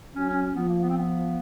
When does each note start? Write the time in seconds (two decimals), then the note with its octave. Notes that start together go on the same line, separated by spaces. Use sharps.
0.15 F#3 C#4
0.29 C#4
0.42 C#4
0.55 F3 B3
0.68 A#3
0.82 B3
0.89 C4
0.97 B3